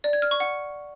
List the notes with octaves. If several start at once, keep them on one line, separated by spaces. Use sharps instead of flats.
D5
G#6
F6
C#6
F#5